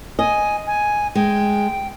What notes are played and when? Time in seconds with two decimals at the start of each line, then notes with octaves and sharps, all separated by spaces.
0.19 D#5 G#5
0.67 G#5
1.15 G#3 G5